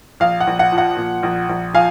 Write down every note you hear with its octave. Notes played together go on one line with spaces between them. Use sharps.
A#1 F5
F#5
A#1
F#5
F3
F#5
A#2
A#1
A#1
F3 F5 G#5